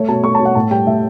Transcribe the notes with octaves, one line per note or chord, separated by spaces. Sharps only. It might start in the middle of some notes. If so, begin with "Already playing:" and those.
Already playing: A3 C#5
B2 A5
A3 C#6
A5
B2
F#5
A2 A5
G3 G5
A2 E5